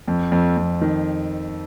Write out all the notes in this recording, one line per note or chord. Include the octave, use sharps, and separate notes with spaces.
F2
F2
F2
D#3